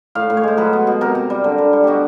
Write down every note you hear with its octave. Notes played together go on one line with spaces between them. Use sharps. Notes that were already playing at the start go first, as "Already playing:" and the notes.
A2 F5
A2
C#5
G#3 C5
F#3 B4
B3
B2
C3 A#4
C3
G3
D3
D3
G3
B2 F#4 G4